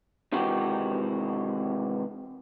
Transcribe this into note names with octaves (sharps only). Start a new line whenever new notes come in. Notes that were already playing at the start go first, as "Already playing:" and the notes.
C3 D#3 E3 G#3 F#4 G4